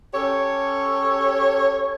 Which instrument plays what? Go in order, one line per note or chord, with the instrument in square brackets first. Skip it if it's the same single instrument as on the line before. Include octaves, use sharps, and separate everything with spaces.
[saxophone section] C#4 G4 A4 C#5